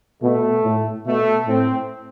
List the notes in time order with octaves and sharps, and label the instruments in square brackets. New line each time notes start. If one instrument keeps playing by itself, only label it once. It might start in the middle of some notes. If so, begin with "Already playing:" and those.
[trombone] B2 [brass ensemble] A3
[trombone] A2
[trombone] B2 [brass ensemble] A3
[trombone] A2 [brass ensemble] C4